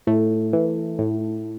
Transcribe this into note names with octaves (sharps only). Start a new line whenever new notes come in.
A2 A3
E3
A2